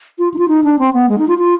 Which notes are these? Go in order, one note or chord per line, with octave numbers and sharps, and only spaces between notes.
F4
D#4
F4
D#4
D4
C4
B3
G#3
D#4
F4
F4